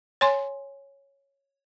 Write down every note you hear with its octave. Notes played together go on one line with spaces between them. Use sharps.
C#5 G#5 C6